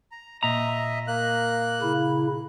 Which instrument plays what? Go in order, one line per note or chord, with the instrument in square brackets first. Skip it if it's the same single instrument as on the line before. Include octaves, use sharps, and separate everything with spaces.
[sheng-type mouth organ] A#5
[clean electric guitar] A#2 A#5 [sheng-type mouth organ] D#5 E5
[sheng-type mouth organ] A#3 F#6
[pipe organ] C#3 E4